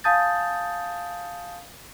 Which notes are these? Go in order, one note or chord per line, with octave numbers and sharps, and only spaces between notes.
F5 G#5 A5 D#6 G6 A6